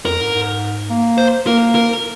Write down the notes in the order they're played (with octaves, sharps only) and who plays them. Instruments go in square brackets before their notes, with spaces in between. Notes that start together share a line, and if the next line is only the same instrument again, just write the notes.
[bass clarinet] F2 [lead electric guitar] A#4
[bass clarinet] G#2
G#2
A#3
[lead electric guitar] C5
[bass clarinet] A#3 [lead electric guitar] A#4
[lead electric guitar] A#4